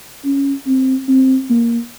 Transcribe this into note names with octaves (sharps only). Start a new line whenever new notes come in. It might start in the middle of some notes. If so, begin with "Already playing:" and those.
C#4
C4
C4
A#3